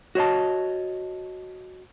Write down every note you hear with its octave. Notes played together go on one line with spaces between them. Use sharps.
F#4 C#5 D#5 A5